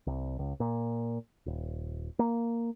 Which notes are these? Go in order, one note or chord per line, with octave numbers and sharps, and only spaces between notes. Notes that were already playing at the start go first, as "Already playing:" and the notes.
C2
C#2
A#2
D#1
A#3